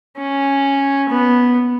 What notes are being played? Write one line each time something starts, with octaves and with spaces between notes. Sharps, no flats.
C#4
B3